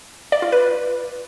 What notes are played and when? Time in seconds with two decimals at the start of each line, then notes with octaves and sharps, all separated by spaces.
0.32 D5
0.42 F4
0.52 B4